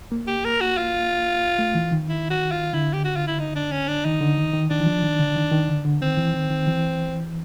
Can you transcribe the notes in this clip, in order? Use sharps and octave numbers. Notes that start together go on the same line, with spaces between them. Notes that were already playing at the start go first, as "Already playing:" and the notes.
A#3
G4
A#4
F#4
F4
A3
E3
D#3
E4
F#4
F4
D3 E4
G4
F#4
F4
E4
D#4
D4
C#4
D4
D#3 D#4
D3
D#3
D#3
D#3 D4
E3
F3
D#3
D3
D#3
D#3
D3
D3
D#3 C4
E3
D#3
D#3
E3